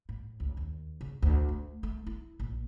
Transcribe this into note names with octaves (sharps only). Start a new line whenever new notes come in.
A2
C#2
D#2
C#3
D2
A3
A3
E4
A#1